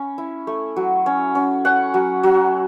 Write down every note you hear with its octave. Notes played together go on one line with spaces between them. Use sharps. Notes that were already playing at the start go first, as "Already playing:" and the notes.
Already playing: C#4 B5
E4
A3
F#3
C#4
C#4
C#4 F#5
F#3
F#3